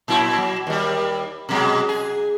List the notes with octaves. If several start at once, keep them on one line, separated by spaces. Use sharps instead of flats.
A#2 F#3 E4
F#3
D#2 G3
B2 F#3 G#3
G#4